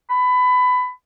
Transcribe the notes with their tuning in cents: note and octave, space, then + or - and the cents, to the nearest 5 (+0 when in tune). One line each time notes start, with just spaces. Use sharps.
B5 +20